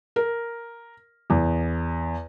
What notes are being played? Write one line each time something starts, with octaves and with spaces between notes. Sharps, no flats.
A#4
E2